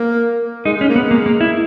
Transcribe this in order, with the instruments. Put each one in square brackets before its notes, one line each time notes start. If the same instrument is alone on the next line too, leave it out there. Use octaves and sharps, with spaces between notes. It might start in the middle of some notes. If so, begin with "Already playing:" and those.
Already playing: [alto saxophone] A#3
[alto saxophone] G#3 [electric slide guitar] D#4
[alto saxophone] G#3
[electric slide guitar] C#4
[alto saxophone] A#3
[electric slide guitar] B3
[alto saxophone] G#3
[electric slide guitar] A#3
A#3
E4